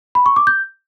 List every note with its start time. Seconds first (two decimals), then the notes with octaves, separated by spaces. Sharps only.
0.15 B5
0.26 C#6
0.36 D6
0.47 G6